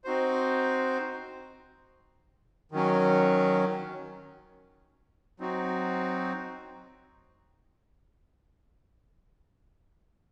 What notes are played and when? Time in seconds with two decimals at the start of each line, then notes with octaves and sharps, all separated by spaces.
0.04 C4 D#4 F#4 C5
2.72 D#3 F#3 C#4
5.40 F#3 C4 D#4 F#4